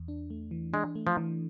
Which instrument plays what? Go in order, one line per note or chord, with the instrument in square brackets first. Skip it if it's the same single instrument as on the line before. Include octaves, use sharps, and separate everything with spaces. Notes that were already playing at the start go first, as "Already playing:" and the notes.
Already playing: [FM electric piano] E2
D4
A3
E3
[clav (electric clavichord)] G#3 [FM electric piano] D4
[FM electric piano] A3
[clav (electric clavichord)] F3
[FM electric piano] E3